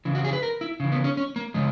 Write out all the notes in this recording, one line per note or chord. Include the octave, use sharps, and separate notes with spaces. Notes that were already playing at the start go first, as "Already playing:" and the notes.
C#3 E3
F#4
G#4
B4
A#4
E4
C#3 E3
B3
C#4
C#4
A#3
C#3 E3 G#3